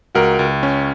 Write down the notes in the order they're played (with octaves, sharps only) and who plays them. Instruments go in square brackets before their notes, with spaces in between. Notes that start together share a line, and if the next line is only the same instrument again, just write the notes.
[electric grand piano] C#2 [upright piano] F#4 A#4
[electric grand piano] C#2
C#4